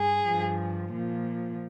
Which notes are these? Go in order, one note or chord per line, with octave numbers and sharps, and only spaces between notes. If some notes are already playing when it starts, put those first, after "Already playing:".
Already playing: G2 G#4
G2 F3
A#2 F3